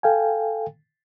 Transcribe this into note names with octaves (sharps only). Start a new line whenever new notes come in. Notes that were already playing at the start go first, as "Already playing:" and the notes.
A4 F5 G5 G#5